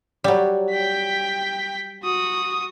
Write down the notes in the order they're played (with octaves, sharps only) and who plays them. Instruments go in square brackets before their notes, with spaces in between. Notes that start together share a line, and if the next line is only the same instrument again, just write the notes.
[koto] F#3 G3
[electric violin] G5 B6
F#4 D#6